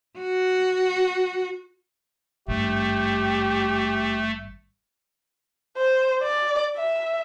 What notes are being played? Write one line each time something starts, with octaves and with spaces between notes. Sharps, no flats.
F#4
G#1 G2 A3 G4
C5
D5
E5